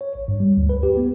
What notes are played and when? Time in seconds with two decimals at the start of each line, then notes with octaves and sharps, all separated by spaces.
0.01 C#5
0.15 A1
0.28 G2
0.40 G3
0.57 D2
0.69 B4
0.83 G4
0.97 B3